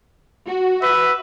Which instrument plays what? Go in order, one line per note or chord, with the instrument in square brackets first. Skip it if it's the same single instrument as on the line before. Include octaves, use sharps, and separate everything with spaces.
[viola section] F#4
[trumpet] B4 [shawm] E5